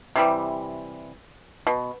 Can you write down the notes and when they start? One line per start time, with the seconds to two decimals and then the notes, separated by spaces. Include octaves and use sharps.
0.16 C3 E3 G3
1.67 B2